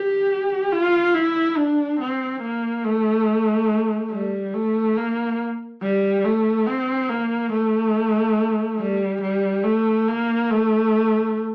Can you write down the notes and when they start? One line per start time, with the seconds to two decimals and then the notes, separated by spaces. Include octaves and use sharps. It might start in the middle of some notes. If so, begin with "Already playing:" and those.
Already playing: G4
0.73 F4
1.14 E4
1.57 D4
2.00 C4
2.42 A#3
2.85 A3
4.12 G3
4.54 A3
4.97 A#3
5.82 G3
6.24 A3
6.67 C4
7.09 A#3
7.52 A3
8.79 G3
9.22 G3
9.64 A3
10.08 A#3
10.50 A3